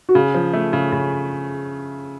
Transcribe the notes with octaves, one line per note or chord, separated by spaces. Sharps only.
F#4
C#3 G#4
F3
A3
C#3
C#3